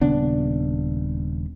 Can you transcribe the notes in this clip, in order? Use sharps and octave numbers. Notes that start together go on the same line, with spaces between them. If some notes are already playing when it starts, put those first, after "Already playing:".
D#1 C#3 B3 D4